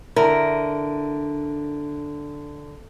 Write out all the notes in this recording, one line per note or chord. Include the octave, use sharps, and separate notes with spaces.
D3 E4 A#4